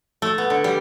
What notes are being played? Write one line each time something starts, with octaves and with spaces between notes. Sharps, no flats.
A3
B3
D3
G3